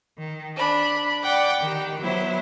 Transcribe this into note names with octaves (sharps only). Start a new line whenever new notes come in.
D#3
D4 B5
D5 F#5 G5 D6
D#3 G4
F#3 B3 E4 C5 E5